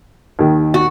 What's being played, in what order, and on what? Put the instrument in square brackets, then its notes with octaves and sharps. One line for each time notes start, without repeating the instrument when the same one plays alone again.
[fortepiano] D#2 D#3
[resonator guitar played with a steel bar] F#4